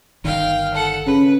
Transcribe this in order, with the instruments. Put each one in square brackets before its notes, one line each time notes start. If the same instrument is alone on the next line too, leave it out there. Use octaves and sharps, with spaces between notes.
[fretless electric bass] G1 D#3 [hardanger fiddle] F5 G5
[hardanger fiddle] A4 F#5
[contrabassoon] C#3 [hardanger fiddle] B4